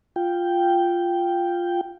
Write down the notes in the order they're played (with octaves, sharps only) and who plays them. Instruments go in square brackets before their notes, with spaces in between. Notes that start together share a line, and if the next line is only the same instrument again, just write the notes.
[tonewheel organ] F4 G5